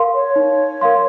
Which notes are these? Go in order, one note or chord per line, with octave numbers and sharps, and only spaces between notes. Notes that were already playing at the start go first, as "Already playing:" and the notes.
Already playing: A#4 F5 C6
C#5
D#4
A#4 F5 C6